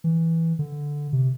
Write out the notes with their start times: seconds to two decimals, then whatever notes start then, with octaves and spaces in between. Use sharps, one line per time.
0.04 E3
0.59 D3
1.13 C3